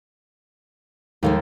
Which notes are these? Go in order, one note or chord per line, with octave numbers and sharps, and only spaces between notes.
D#2 F3 G#3 A3